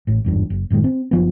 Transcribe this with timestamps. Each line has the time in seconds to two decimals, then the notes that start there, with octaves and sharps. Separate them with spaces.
0.07 A1 A2
0.25 G#1 E2 G2
0.50 F#1
0.70 F#1 A2 D#3 G#3
0.84 C4
1.11 F#1 F3 B3